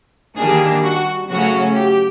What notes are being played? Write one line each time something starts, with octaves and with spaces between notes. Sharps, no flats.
D#3 G3 A#3 D4 G#4
F#4
C#3 F#3 A3 C#4 F#4
G4